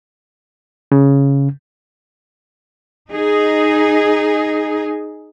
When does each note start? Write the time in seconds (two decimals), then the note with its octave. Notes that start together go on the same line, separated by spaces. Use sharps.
0.92 C#3
3.11 D#4 G#4